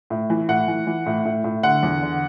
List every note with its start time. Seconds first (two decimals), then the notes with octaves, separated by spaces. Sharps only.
0.10 A2
0.30 E3
0.48 A2 F#5
0.68 E3
0.87 E3
1.06 A2
1.25 A2
1.44 A2
1.63 D3 F#5
1.83 E2
2.02 D3